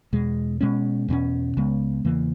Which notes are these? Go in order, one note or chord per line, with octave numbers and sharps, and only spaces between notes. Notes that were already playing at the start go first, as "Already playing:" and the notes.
E2 B2 G#3
B2 G#3 C#4
E2 B2 A#3 C#4
C#2 C#3 G#3 B3
E2 C#3 E3 A#3